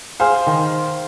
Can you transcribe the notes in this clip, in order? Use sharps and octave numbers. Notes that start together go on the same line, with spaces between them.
G#4 C5 F5
D#3